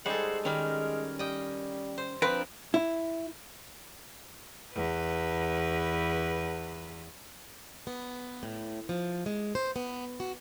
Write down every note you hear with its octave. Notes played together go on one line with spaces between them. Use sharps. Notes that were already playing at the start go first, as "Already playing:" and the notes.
G3 G#3 D#4 G#4 A4 C5 F#5
D#3 G3 C#4 A#4 F6
G3 D#5 G5
C5
F3 C4 D4 A#4 B4
E4
E2 B4
B3
A2
F3
G#3
C5
B3
F#4